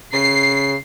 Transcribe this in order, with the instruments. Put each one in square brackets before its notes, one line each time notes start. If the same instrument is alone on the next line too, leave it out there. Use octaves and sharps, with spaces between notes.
[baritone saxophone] C#3 [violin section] C7